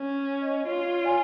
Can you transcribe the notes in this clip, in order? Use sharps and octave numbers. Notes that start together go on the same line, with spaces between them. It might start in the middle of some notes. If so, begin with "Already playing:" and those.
Already playing: C#4
D#5
F4 C#5
G#5